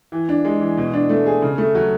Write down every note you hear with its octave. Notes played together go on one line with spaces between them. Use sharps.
E3
D4
G#3
E3
B2
D4
A3
G#4
C#3
A3
F#3